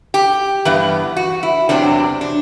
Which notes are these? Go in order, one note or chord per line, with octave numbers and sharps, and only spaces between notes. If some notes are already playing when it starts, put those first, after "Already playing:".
G4
G2 E3 B3
F#4
E4
E2 C3 F#3 C4 D4
D4